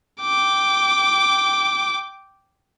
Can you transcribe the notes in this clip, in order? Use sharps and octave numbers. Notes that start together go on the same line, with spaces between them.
G5 D6